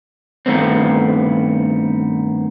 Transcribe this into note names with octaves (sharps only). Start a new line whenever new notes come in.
G2 D#3 A3 B3 C4